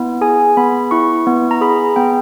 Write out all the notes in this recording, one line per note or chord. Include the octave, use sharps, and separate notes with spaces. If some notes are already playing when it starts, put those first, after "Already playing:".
Already playing: B3 E4
G#4 G#5
B3 B5
E4 C#6
B3
A#5
G#4 B5
B3 G5